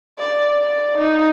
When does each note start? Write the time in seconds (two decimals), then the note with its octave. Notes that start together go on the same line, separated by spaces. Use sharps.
0.19 D5
0.60 D5
0.98 D#4